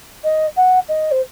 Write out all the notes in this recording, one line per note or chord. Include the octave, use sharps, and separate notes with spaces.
D#5
F#5
D#5
C5